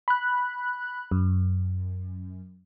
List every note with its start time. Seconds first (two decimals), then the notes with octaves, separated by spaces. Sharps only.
0.08 B5 F#6
1.11 F#2